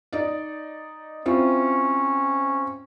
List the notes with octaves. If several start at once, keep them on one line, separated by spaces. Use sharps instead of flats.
D#4 D5
C4 C#4 E4 F4